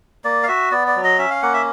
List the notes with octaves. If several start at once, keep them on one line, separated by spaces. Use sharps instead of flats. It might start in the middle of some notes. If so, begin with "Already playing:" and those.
A#3 D5
F5
F#4 E5
B3 D5
D5
F#3
D#5
C#4 E5
F5
A#3 F#5
E5